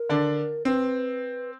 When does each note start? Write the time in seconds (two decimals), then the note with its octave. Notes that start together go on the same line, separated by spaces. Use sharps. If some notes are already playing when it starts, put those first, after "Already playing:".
Already playing: A#4
0.09 D3 D4
0.65 C4 B4